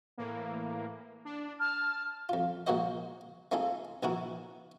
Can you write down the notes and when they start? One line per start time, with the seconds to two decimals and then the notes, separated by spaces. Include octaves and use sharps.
0.18 A2 E3 A#3
1.25 D4
1.60 A5 F6
2.29 F2 F4
2.67 A#1 G#3 A#3 F#4 C5 D#5
3.52 A3 C4 D#4 F4 G#4 A4
4.03 A#1 D#3 E3 E4 F#4 A#4